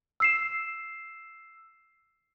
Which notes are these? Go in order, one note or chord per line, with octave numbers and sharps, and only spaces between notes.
E6 C7 E7